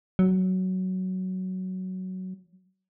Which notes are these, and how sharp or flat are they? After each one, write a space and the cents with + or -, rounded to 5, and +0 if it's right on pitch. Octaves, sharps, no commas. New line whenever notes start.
F#3 +10